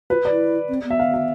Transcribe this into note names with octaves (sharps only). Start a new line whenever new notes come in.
F4 B4
D5
E4
C4
B3
E5
F5
E5